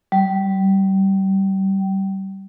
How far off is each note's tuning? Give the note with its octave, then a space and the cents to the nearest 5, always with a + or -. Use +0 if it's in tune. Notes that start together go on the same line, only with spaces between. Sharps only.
G3 -25